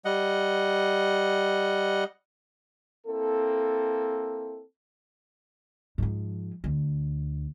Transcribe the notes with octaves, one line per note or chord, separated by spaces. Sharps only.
G3 D#5 F#5
A#3 C4 E4 A4
G#2 F3
D2